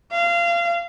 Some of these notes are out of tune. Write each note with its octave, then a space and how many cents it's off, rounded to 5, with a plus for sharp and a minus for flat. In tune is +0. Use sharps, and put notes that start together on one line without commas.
F5 -25